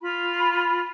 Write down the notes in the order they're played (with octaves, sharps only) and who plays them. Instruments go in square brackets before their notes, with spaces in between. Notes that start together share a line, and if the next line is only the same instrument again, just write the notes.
[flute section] F4 B5